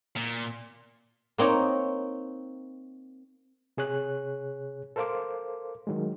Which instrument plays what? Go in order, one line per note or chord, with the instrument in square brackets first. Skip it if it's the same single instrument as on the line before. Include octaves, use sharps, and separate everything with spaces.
[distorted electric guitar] A#2
[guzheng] A#3 C4 D#4 C#5
[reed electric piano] C3 G#4 C#5 F#6
A4 A#4 C5 F5 C6 D6
D#3 F#3 G#3